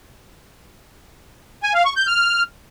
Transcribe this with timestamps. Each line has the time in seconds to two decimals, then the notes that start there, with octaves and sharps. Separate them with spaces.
1.63 G#5
1.74 F5
1.85 C#6
1.96 G6
2.07 F6